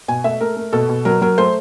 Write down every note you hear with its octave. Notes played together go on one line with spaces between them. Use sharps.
B2 G#5
A3 E5
A3 A#4
A3
B2 A4
B2
F#3 A#4
F#3 A#4
A3 C5